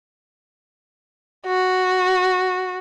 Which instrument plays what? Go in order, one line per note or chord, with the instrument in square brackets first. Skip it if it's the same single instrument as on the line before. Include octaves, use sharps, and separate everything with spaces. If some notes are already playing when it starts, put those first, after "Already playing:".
[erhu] F#4